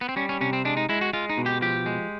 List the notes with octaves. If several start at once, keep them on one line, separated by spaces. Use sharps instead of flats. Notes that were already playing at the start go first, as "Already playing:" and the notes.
B3
C4
G3 C#4
C#4
C3 C#4
C4
G#3 D4
D#4
G#3 E4
F#4
G#3 F4
D#4
B2
G4
F3 G4
G#3